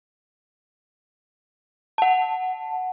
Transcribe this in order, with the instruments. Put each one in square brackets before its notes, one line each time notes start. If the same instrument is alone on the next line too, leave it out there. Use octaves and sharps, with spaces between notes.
[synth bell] F#5 A5